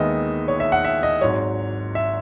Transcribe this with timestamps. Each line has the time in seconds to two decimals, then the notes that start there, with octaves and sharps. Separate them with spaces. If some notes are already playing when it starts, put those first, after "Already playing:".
Already playing: D#2 D#3 G#3 B3 D#5 E5
0.48 C#5
0.60 E5
0.72 F#5
0.84 E5
1.03 D#5
1.21 G#1 G#2 F#3 C#5
1.95 E5